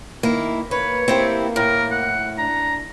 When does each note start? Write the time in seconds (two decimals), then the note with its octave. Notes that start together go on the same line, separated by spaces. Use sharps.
0.23 D#3 A#3 E4
0.71 A#3 B4 C#5
1.08 A#3 C4 E4 G4
1.56 A2 A#4
1.91 F#5
2.38 D4 A#5